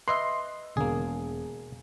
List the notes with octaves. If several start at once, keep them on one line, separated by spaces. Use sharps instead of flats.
B4 D#5 E5 C6
E1 A#3 G#4